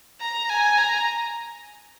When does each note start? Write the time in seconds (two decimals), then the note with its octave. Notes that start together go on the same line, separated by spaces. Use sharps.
0.21 A#5
0.49 G#5
0.77 A#5